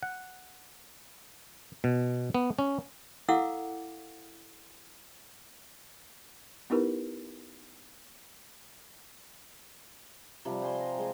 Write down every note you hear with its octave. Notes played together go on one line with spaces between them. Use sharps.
F#5
B2
B3
C#4
E4 A4 F5 F#5 D6 E6
B3 D#4 E4 G4 A#4 B4
C3 F3 G3
C5 G#5 C6
A#5
G#3 D5